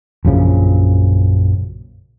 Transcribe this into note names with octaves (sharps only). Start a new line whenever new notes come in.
A#1 F#2 C#3 F3